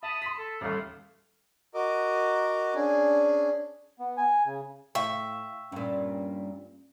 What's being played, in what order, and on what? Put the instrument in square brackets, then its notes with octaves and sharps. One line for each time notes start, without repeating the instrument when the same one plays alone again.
[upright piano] E5 [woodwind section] A5 B5 D#6
[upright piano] C6 B6
[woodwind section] A4
[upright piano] A1 D#2 [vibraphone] G3 A4 E5 [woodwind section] A3 F5
[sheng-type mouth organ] F#4 A#4 D#5 D6
C#4 D4 G#4
[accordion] B3
G#5
C#3
[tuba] A2 [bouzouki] E5 [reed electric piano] F5 G5 C#6
[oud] G2 A#2 [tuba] C#4